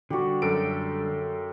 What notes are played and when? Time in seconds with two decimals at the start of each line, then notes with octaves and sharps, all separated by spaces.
0.10 D3 G3 F#4 G4
0.42 F#2 A4 G5 D7